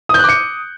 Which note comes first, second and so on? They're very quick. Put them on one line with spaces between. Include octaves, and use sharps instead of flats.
D#6 G6 F#6 D6 C#7